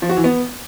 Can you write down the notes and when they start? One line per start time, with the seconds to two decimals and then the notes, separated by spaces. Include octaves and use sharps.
0.02 F3
0.09 F#4
0.17 E3
0.24 B3